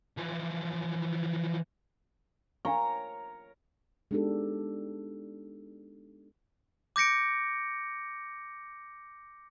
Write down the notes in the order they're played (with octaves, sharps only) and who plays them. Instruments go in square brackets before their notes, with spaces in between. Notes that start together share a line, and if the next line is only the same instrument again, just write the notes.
[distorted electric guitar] E3 F3
[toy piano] D4 F5 C#6 [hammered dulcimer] A#4 C#5 A#5
[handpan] G#3 B3 D4 D#4 G4 A4
[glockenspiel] D6 G6 A#6 C#7 D7